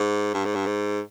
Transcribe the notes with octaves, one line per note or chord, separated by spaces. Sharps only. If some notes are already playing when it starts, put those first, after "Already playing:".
Already playing: G#2
G2
G#2
G2
G#2